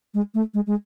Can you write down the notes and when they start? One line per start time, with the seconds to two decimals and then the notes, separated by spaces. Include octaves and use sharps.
0.14 G#3
0.34 A3
0.54 G#3
0.67 G#3